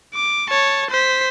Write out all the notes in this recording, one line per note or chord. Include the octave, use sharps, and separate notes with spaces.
D6
C#5 A5
C5 B6